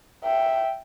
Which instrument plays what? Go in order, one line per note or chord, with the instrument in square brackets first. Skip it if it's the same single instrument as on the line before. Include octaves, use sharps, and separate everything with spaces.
[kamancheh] E5 G5